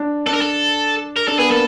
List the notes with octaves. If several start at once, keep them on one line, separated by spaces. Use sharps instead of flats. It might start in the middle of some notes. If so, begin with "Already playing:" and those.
Already playing: D4
D4 A4
A#4
A4
A#4
D4 A4
B3 G#4
A#3 A4